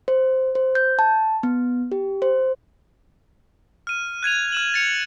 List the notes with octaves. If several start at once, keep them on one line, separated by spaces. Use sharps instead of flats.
C5
C5
G6
A5
B3
G4
C5
F6 D#7
F#6 G#6 D#7 F7
F6 E7 F#7
A6 C#7 F7